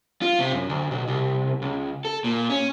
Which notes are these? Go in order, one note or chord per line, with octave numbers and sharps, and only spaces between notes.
F4
C3
F#2
D2
B1
C2
C#2
A4
A#2
C#4